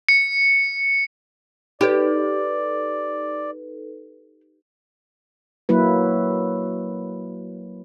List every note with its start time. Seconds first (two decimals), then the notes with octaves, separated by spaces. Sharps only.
0.09 C#7
1.81 D#4 G4 A4 B4 D5
5.69 F#3 A#3 E4 B4